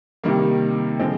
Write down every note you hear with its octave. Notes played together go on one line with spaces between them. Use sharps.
C3 D#3 G3 A#3
D3 F3 G#3 C4